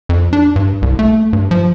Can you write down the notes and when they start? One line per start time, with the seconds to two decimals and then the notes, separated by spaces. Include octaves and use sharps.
0.09 F2
0.33 D4
0.56 G2
0.82 C2
0.99 A3
1.33 G2
1.51 F3